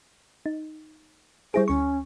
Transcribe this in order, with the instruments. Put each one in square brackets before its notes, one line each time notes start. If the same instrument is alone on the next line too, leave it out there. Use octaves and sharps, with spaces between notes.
[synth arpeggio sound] D#4
[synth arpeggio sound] G3 E4 G#4 [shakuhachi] C5
[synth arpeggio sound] D2 C#6 [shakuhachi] C#4